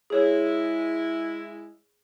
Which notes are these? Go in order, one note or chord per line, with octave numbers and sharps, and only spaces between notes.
G#3 E4 G#4 C#5